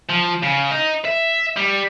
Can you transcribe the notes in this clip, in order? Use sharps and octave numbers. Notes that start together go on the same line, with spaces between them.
F3
C#3
D#4
E5
G3